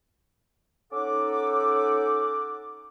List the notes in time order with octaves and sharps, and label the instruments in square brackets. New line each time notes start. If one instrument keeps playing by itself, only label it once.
[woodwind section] C#4 D#4 A4 F#5 D6